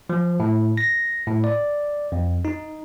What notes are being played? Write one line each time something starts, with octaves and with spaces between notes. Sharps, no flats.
F3
A2
A#6
A2
D5
F2
D#4